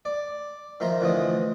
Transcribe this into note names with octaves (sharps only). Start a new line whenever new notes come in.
D5
D#3 F3 E5 A#5 C6
D3 E3 F3 A3 D#5